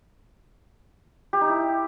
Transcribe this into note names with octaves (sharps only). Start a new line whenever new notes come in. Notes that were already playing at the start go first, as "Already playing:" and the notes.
G4
D#4
E4